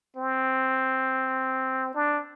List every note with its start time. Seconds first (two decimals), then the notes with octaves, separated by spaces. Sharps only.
0.16 C4
1.94 D4